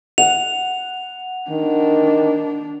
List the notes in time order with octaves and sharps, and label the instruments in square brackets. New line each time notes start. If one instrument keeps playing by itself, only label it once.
[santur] F#5 [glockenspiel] F7
[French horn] D#3 [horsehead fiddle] D4